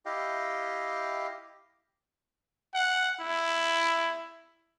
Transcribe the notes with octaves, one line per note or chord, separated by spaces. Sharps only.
E4 G4 D#5 F5 G5
F#5
E4